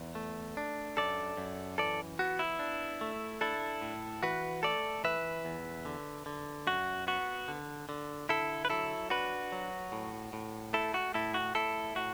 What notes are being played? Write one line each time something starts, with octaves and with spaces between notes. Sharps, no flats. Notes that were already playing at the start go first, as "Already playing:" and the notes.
Already playing: E2
A3
D4
F#2 A4 D5
F#2
E3 A4 D5
B3 F#4
E4
D4
A3
D4 E4 A4
A2
E3 F#4 B4
A3 A4 D5
E3 B4 E5
E2
D3
D3
F#2 F#4
B3 F#4
D3
D3
D3 E4 A4
B4
F#3 E4 A4
D4 F#4 B4
F#3
A2
A2
A3 E4 A4
F#4
A2 E4 A4
F#4
A2 E4 A4
A2 F#4